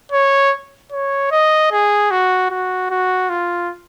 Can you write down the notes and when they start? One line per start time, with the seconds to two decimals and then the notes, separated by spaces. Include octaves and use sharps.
0.12 C#5
0.92 C#5
1.31 D#5
1.71 G#4
2.11 F#4
2.51 F#4
2.90 F#4
3.30 F4